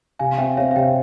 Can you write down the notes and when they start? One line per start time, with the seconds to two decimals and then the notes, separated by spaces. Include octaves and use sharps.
0.19 C3 F5 G#5
0.38 C4 E5 G5
0.57 C4 C#5 F5
0.71 F5
0.76 C3 E5 G5